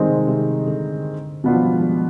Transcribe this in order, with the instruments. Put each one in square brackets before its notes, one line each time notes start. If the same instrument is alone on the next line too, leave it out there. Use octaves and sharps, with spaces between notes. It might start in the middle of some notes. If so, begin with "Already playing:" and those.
Already playing: [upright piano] D#3 G#3 C4 D#4 [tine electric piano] G3
[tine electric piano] C3
C3
D3
[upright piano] B2 B3 D4 F4 [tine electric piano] D#3
[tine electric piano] F3
G3
G#3
G3